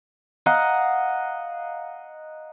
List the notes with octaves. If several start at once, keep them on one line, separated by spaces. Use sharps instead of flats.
D#5 F5 F#5 A#5